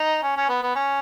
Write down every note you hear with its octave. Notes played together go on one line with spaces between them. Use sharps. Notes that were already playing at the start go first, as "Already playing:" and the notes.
Already playing: D#4
C#4
C#4
B3
B3
C#4